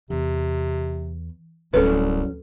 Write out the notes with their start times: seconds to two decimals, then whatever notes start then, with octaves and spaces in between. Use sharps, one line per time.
0.10 E2 C3
1.74 D1 C2 F#3 C#4 A4 B4